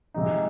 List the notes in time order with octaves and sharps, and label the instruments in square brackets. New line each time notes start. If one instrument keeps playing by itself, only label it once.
[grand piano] C3 F3 G#3 D#4